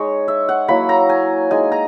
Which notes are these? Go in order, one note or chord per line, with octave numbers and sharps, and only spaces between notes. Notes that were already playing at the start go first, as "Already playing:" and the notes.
Already playing: G#3 D#4 C#5
E5
F#5
F#3 A#3 E4 B5
A#5
G#5
G#3 D#4 G#5
A#5